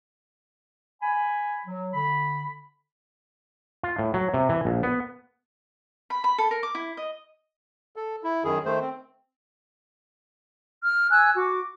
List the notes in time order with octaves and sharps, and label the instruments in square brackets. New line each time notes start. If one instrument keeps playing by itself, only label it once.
[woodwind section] G#5 B5
F#3
D3 B5
[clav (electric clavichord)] F4
A2
F#3
C3
E3
A#1
B3
[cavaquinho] B5
B5
A4
A#4
D6
E4
D#5
[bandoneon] A4
E4
F#2 D#3 G#4
D#3 A3 C5
C4
[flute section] F6
G#5 E6 F#6
F#4 D6